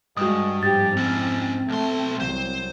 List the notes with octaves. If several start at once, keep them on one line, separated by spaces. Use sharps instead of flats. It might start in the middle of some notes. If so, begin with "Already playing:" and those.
G2 G#3 F#4 D#6
F2 G#2 G4 A6
C4 C#4 E4
B1 A3 C6
C2 F#3 C5